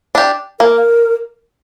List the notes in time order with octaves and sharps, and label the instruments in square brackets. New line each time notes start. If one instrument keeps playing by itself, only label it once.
[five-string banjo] D4 G4
[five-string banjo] A#3 [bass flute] A#4